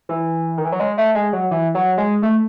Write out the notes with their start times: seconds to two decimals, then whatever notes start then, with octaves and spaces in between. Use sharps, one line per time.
0.09 E3
0.57 D#3
0.64 E3
0.72 F#3
0.80 G#3
0.98 A3
1.15 G#3
1.33 F#3
1.51 E3
1.75 F#3
1.98 G#3
2.22 A3